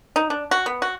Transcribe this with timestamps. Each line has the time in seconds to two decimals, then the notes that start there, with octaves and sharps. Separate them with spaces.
0.16 D#4
0.30 D4
0.51 F#4
0.66 B3
0.82 F#4